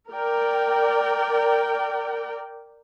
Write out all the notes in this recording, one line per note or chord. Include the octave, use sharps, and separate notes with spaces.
A#4 D5 G5